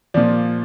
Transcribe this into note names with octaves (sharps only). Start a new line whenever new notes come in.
A#2 F3 D5